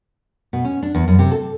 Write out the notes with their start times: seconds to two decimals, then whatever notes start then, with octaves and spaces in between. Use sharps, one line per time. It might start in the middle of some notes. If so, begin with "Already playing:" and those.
0.53 B2
0.65 C#4
0.83 D4
0.95 E2
1.08 F#2
1.19 C3
1.32 A4